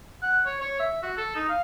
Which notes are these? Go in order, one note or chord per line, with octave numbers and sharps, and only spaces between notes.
F#5
C#5
C#5
E5
F#4
A4
D#4
F5